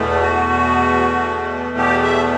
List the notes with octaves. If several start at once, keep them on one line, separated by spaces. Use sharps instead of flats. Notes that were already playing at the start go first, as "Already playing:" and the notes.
Already playing: E2 B2 A3
F#4
G4
E5